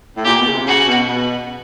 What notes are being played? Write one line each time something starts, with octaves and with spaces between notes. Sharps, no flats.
A2
A#2 G4
B2
C#3
C3
C#3 F#4
B2
B2